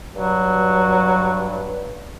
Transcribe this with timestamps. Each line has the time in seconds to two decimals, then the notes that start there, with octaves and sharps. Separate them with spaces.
0.16 G2 F#3